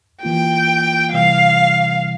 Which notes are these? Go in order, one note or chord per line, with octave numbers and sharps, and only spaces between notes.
E3 A#3 F4 G5
C3 E3 G3 F5